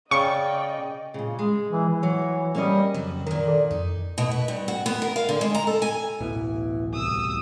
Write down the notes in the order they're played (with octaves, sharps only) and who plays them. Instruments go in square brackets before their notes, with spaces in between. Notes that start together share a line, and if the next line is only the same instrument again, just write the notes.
[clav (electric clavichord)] C#3 [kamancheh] D5 G5 [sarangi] D#5 [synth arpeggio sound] C#6
[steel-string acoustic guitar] A#2 C#3
G#3
[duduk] E3
E3
[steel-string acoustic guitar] F#3 C#5
[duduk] G3 [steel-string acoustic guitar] A#3 C#4 D#5
[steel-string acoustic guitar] F2 F#3 [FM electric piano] C#3
[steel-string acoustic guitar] A#2 D#3 [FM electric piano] A#4
[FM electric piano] A4 D5
[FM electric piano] F2 [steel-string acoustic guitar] D#4
[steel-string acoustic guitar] B2
B4
G2
F#4
B3
A#4
F5
D3
G#3
A#5
A4
G#5
[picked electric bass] D1 A1 B2 [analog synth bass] E3
[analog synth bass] C2 [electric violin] D#6 E6